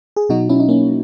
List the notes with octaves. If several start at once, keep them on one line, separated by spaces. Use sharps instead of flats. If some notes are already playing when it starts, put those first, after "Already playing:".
G#4
B2 F#3 D#4 F#4
C#4 E4
D#4
A#3 C#4